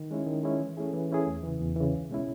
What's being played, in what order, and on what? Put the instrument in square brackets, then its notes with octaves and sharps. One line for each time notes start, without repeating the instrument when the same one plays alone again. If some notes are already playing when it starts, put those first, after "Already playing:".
Already playing: [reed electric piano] D#3
G#3 C#4 E4
D#3
G#3 C#4 E4
E3
A3 C#4 E4 G#4
E3
A3 C#4 E4 G#4
E2
C#3 E3
E2
C#3 E3
C#2
B2 G#3 C#4 E4